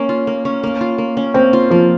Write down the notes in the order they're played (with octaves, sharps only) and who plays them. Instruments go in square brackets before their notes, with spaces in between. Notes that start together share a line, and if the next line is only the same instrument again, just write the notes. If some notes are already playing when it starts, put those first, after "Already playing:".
Already playing: [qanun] A#3 C#4
F4
A#3
C#4
A#3
F4
A#3
C#4
[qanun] A#3 [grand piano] C4
[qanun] F4
[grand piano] F3 [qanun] A#3